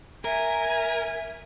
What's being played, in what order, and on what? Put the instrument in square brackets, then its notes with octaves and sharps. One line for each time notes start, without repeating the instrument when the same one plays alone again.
[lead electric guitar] A#4 [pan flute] E5 [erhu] G#5